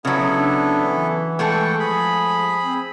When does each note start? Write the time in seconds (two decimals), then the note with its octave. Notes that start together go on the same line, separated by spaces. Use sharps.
0.05 C#3 F#3 B3 E4 A4
0.36 D4
0.83 E3
1.39 G#3 A3 A4 F#5 G5 C#6
1.80 F3 G#4 B5
2.62 C4